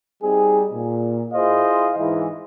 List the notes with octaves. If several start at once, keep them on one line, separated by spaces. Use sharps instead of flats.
G3 C4 D#4 G#4
A#2
E4 F4 G#4 C5 D#5 F5
G#2 E3